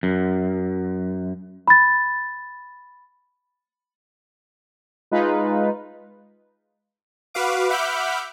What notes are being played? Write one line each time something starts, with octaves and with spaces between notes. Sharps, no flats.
F#2
B5 A6
G#3 D#4 F4 B4
F#4 B4 F5 D6
E5 F#5 B5 D6 F6 G6